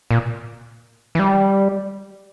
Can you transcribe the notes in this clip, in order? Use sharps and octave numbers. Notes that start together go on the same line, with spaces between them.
A#2
E3
G3